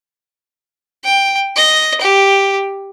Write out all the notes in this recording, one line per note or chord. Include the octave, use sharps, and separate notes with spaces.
G5
D#5
G4